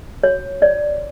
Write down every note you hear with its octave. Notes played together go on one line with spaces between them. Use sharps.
F#4 C#5
C#5 D5